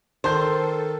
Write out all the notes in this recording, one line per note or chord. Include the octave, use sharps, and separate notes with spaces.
D#3 A4 C5 A5 G6